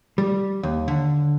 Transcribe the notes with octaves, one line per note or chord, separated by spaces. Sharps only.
G3
D#2
D3